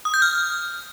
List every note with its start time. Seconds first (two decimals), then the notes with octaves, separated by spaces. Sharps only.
0.05 D#6
0.14 G6
0.22 F6